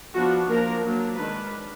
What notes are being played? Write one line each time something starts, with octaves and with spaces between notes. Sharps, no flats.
F3 B3 D4 F#4
F3 A#3 D4 A#4
F#3 A#3 D4
D#3 G#3 D4 B4